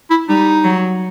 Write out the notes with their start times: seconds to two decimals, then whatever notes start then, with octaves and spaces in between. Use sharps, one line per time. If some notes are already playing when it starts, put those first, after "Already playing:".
0.10 E4
0.29 G3 D#4
0.64 F#3